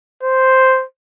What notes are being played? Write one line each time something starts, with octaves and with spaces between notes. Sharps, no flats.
C5